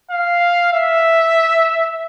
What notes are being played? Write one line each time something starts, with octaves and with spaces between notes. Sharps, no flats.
F5
E5